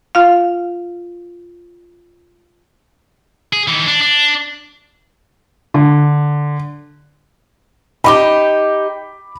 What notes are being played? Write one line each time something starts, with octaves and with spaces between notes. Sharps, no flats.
F4 F5
G#4
D#3 E3
D4
D4
D3
D#4 F4 G4 B5 D6